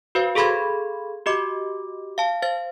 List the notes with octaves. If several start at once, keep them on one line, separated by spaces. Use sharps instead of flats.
F#4 B4 C5 F5
G#4 A4 F5 B5 C6 G#6
F#4 G4 D#5 D6
F5 A5
C5 F5 A6